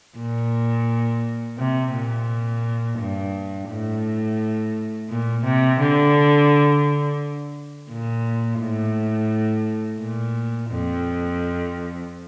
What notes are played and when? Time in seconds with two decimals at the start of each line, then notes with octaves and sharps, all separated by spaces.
0.18 A#2
1.58 C3
1.93 A#2
2.99 G2
3.69 A2
5.09 A#2
5.45 C3
5.79 D3
7.90 A#2
8.60 A2
10.01 A#2
10.71 F2